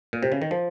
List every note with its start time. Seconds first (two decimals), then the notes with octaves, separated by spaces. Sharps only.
0.13 A#2
0.23 C3
0.32 C#3
0.42 D#3
0.51 F3